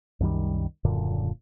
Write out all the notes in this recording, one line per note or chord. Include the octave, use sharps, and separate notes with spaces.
C2 F#2 D#3 G3
D#1 F#2 A#2 D3